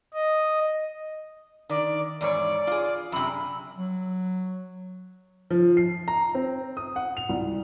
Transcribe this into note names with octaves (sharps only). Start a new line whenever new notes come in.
D#5
D#3 D5
E2 G#2 C#5 D5
F4 G#4
F#2 C3 B5
F#3
F3
C7
A#5
C4
D#6
F#5
F7
C2